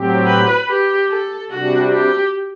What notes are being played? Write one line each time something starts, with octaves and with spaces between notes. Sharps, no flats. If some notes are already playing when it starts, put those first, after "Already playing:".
Already playing: A2 F#3 C4 G4
B4
G4
A4
C3 G3 D4 F#4
G4